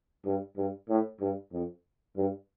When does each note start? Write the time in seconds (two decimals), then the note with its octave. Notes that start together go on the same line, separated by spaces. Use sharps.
0.25 G2
0.57 G2
0.89 A2
1.20 G2
1.52 F2
2.16 G2